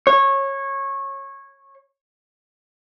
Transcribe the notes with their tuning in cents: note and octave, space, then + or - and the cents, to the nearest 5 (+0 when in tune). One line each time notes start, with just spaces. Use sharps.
C#5 -20